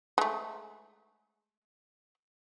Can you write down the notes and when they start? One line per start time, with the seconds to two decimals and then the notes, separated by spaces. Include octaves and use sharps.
0.18 G#3 A3